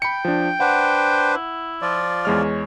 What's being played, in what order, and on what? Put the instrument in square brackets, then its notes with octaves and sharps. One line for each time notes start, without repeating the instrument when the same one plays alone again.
[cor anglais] G5 [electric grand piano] B5 C#7
[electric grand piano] F3 D4
[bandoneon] D4 B4 C5 [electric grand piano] F#5
[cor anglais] E4
[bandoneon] F3 F4 D5
[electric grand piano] E2 G#3 F6 [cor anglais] C#5